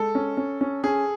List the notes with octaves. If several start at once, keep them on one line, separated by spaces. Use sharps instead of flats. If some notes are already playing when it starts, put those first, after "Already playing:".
Already playing: G#3 A4
C#4
C#4
C#4
C#4 G#4